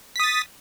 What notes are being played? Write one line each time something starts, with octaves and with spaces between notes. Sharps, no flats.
D#6 A6 B6